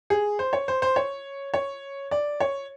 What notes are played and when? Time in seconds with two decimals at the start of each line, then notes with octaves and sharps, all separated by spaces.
0.10 G#4
0.39 C5
0.53 C#5
0.68 C5
0.82 C5
0.96 C#5
1.54 C#5
2.11 D5
2.40 C#5